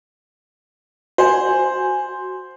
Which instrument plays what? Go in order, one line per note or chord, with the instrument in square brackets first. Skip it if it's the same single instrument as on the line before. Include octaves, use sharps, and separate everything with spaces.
[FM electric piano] F#4 G#5 [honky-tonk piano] C5